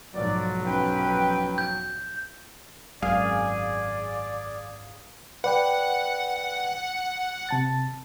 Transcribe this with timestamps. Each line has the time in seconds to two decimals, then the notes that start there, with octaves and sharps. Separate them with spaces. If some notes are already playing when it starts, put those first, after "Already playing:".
0.15 B1 G#2 F3 F#3 D5
0.65 C#4 B4 G5
1.58 G6
3.02 G#1 F#2 G#4 D5 F5
5.44 B4 D5 F#5 G5
7.49 C3 A5 A6